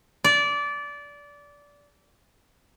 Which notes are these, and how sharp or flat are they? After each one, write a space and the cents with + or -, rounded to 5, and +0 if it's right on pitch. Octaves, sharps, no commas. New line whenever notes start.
D5 -20